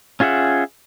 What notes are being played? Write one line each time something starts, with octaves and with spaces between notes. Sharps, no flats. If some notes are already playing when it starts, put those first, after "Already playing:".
C#4 F4 G#4 E5 F#5